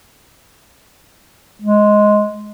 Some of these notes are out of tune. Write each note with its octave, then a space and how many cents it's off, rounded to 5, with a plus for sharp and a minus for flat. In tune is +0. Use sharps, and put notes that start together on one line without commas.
G#3 +10